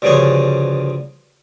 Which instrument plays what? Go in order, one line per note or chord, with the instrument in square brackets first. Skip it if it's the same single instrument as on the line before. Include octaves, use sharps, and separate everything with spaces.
[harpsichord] D2 G2 C#3 F3 G#4 C#5